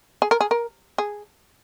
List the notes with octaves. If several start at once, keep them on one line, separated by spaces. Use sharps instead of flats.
G#4
A#4
G#4
A#4
G#4